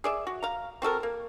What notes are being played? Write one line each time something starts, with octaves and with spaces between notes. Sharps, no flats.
G#4 D5 E5
F#4
F5 A#5
C4 F#4 A4 A#4
A#3